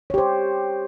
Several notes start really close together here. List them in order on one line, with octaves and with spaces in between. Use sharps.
C#5 G4 C5